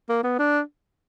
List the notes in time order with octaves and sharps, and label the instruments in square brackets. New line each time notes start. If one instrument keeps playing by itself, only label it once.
[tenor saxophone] A#3
B3
D4